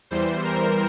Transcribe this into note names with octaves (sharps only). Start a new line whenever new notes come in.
E2 E3 G3 C5
A#4